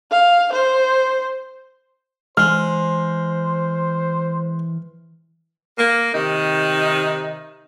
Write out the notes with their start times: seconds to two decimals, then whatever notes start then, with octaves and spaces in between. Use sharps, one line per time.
0.12 F5
0.53 C5
2.37 E3 G#3 C5 F6
5.78 A#3
6.14 C3 D#3 D#4